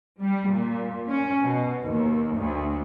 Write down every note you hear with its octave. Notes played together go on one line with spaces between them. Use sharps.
G3
A#2
C#4
B2
D#2
D2